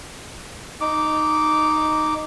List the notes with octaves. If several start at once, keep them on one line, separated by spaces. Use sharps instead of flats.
D#4 D6